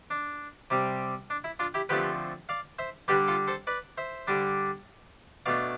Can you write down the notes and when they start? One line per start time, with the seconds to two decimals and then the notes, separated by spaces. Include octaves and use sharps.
0.10 D4
0.70 C3 G3 C4
1.30 D4
1.44 E4
1.59 D4 F4
1.74 E4 G4
1.89 D3 F3 A3 C4 G4 B4
2.49 D5 F5
2.79 C5 E5
3.08 D3 G3 D4 G4 B4
3.28 F4 A4
3.48 A4 C5
3.67 B4 D5
3.98 C5 E5
4.27 D3 G3 D4
5.46 B2 A3 D4 D5 F5